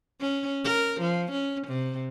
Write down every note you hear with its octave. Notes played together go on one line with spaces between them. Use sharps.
C#4
A#4
F3
C#4
C3